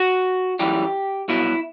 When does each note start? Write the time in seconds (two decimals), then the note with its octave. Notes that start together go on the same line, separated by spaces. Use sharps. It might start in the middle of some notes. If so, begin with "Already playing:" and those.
Already playing: F#4
0.59 F#2 E3 G3 G4
1.28 C2 B2 F#3 E4